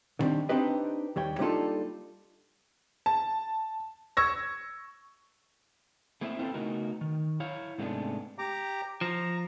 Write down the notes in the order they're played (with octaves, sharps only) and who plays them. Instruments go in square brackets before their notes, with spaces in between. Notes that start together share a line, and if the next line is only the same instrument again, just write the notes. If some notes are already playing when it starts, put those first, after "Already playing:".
[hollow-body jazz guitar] D3 D#3 G3 C4 D4
C4 D4 D#4 G4 B4 D#5
D#2 G3 C#5 G5
G3 A#3 D4 D#4 F4 A4
[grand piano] A5
C#6 E6 G#6 A#6
[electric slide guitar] A3 A#3 C4 E4 E5
C4 E4 F4 A4 B4
C#3 A3 B3 D#4 F#4 A#4
D#3
E4 C#5 F5
G#2 C3 G#3 A3 B3 D4
[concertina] G4 A#5 D6
[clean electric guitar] F3 [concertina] A#5